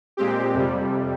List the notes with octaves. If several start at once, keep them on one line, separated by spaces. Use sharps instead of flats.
A#2 G#3 C4 G4
F2 C3 G3